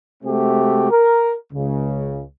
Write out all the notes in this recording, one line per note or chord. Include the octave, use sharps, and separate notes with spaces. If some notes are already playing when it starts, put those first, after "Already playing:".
C3 G#3 A3 C4 F#4 G4
A#4
C#2 C#3